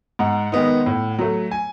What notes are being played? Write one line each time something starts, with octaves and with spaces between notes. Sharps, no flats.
G#2 F#5
D#3 G#3 B3 D#4
A2
F#3 A3
G#5